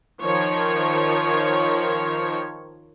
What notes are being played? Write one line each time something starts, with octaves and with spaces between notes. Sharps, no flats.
D#3 F3 C#5